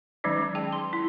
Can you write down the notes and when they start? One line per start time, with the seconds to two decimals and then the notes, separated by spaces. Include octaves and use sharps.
0.24 D#3 F#3 G#3 C#4 D#4
0.55 G#4 G5 A5
0.72 C6
0.93 E4